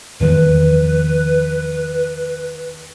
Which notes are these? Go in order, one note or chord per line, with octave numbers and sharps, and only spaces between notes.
E2 D#3 F3 B4